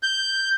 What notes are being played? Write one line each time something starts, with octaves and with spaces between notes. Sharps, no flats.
G6